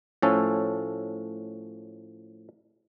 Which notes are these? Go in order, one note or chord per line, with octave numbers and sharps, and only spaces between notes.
A2 F3 C#4 A4